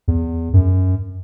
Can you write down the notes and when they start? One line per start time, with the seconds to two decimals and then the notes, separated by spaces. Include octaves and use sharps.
0.08 E2
0.53 F#2